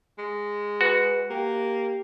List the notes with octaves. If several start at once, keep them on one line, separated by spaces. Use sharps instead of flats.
G#3
F#4 B4
A#3 G4